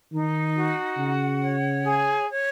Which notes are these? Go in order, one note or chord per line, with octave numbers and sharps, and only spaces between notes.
D#3 D#4
F#4
C#3 F#5
C#5
G#4
C#5